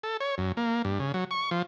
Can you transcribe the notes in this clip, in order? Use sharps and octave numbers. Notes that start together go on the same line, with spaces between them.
A4
C#5
F#2
A#3
G2
C#3
F#3
C#6
F3